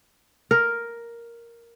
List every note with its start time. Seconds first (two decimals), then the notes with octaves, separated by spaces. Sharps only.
0.51 A#4